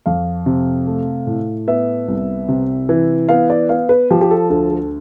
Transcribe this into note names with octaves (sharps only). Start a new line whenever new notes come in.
F2 F5
C3
A3
A2
B3 E5
C2
C3
E3
B3 F5
D5
B3 F5
B4
F3 G4
G4
A4
D2 A4
A4